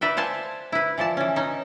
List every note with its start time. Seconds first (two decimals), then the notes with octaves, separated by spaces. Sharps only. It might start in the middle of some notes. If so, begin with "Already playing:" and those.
0.01 B4 D5 E5 F#5 G5
0.17 C5 F5 F#5 G#5 A5
0.72 E4 B4
0.98 E3 F3 D5 A5
1.17 E3 C#4
1.36 C#4 D#4